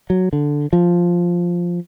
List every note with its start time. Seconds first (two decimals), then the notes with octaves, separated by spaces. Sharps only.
0.10 F#3
0.33 D3
0.73 F3